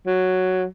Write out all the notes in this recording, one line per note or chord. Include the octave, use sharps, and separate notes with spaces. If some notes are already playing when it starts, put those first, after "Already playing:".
F#3